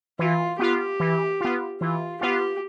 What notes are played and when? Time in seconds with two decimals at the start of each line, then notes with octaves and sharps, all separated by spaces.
0.19 E3 F4
0.59 B3 F4 G4
1.00 E3
1.41 B3 F4
1.81 E3 F4
2.21 B3 F4 G4